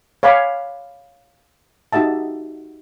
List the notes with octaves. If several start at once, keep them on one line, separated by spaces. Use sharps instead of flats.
C#5 F5 G#5 B5 D6
D#4 F#4 G4 E5 A5